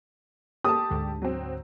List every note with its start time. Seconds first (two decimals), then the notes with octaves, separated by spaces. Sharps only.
0.64 G4 A4 A5 D#6
0.90 D2 G#2 D3
1.22 F#3 C4